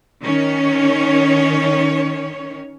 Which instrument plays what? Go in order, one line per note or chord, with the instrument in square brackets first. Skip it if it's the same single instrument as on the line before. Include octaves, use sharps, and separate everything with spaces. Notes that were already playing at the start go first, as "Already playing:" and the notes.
[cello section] D#3 C#4 C#5